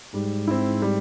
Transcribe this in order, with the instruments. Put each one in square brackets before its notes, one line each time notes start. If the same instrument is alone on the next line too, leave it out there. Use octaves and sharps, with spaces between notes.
[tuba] G#2 [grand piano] G3
[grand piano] C4 E4
G3